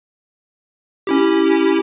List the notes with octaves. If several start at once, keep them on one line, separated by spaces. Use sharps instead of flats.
C#4 E4 G4